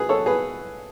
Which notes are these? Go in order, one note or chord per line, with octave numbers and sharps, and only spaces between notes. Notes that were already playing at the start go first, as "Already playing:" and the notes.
Already playing: B2 G#4 B4
A4 C#5
G#4 B4